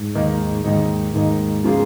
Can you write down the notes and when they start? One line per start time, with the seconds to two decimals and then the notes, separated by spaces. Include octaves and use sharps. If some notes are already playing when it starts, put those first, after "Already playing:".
Already playing: G#2
0.15 D#2 D#3 A#3 D#4
0.64 D#2 G#2 D#3 A#3 D#4
1.14 D#2 G#2 D#3 A#3 D#4
1.64 C#3 F3 A#3 F4 G#4